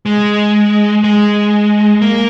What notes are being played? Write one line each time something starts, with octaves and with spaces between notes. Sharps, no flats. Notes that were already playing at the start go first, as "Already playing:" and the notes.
G#3
G#3
A#3